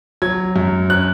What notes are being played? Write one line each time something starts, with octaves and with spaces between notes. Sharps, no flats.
F#3 G#6
F#2
C#4 F#6